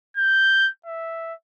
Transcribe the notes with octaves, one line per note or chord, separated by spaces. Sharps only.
G6
E5